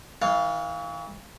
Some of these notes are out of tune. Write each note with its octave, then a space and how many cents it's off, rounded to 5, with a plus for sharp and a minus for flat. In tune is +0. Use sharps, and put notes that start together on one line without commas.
E3 -40 F5 +0